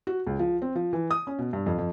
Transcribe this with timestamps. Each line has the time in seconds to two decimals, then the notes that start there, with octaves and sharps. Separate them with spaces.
0.07 F#4
0.27 C#2
0.39 F3
0.62 C4
0.75 F3
0.93 E3
1.11 D#6
1.27 C#4
1.39 B2
1.53 G2
1.66 F2
1.78 F2